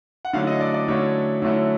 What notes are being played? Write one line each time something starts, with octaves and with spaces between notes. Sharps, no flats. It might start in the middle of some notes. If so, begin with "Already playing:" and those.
F#5
D3 F#3 A3 C#4 E4 F5
D#5
D5
D5
D3 F#3 A3 C#4 E4 C#5
D3 F#3 A3 C#4 E4